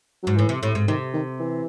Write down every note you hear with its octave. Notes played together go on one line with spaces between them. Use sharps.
G#2 F#3
A2 E3
C3
A2
G#2
C3 D#3
D#3
E3